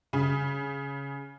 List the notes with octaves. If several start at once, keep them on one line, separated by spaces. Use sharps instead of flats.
C#3